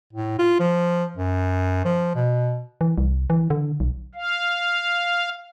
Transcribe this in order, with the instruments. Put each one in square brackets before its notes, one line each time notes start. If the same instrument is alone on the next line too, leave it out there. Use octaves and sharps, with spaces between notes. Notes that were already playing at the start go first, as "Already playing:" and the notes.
[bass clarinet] A2
F4
F3
F#2
F3
B2
[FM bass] E3
C2
E3
D3
B1
[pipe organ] F5